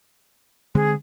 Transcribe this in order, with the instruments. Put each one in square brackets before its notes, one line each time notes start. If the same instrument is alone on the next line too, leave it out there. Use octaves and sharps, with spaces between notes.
[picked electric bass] D3 G#3 C4 [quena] G#4